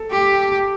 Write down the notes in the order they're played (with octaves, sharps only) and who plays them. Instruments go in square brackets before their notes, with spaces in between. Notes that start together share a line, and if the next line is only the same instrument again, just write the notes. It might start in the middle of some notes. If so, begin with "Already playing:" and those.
Already playing: [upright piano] A4
[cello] G4